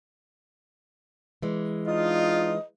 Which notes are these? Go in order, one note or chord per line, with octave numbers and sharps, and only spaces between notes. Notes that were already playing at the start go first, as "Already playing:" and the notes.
E3 G#3
D4 D#4 F4 D#5